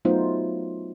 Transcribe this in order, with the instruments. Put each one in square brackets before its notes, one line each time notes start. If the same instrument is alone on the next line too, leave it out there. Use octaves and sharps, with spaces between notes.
[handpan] F#3 A3 B3 D#4 F4 C5